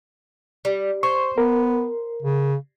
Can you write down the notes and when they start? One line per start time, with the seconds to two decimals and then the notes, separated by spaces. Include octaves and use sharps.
0.65 G3
1.03 C5 C#6
1.38 B3 A#4
2.22 C#3